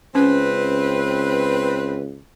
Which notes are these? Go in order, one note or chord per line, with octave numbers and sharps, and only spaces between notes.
C#2 C4 C#4 B4